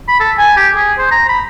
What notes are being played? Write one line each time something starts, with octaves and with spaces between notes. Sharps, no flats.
B5
A4
G#5
G4
G#4
C5
A#5
B5